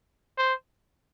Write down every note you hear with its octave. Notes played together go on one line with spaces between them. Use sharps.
C5